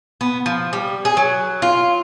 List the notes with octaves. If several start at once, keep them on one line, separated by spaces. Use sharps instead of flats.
B3
F3
G3
G#4
F#3
F4